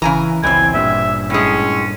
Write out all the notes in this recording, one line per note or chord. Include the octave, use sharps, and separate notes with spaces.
G#1 C#3 E3 G#5 A#5
C#2 B2 E3 C4 G#5
G2 A#2 E5
A2 G#3 C#4